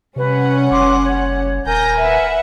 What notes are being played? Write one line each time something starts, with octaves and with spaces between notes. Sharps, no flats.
C3 G3 C#4 B4 F#5
F#1 C6 D6
C#5
D#1 A#4 G#5 A#5 G6 A#6
B4 E5 F#5